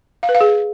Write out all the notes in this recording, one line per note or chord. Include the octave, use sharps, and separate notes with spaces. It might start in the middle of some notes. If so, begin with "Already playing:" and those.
F5
B4
F5
G#4